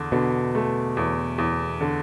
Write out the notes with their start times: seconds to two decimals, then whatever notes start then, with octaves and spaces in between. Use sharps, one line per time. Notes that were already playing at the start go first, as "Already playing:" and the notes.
Already playing: E2 D3
0.12 B2 D3
0.55 A3
0.97 E2
1.38 E2
1.81 D3